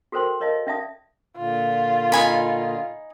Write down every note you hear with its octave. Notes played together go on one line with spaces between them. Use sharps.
F#4 A4 A#4 C5 G5 C6
A#4 C#5 D#5 F5 A5
C#4 D5 E5 F5 A5 D#6
A#2 D3 F4
D#4 G#5 B5